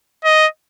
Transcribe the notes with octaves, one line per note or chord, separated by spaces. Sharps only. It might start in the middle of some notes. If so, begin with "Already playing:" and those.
D#5